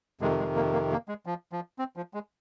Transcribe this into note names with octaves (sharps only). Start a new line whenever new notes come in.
F2 C3 D#3 G#3
G#3
A#3
A#3
A#3
G#3
F3
F3
C4
F3
G#3